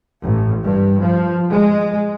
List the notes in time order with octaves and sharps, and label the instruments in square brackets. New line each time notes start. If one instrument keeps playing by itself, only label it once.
[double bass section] A1
G2
F3
G#3